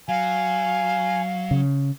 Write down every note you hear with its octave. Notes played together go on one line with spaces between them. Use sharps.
F#3 F5 G#5
C#3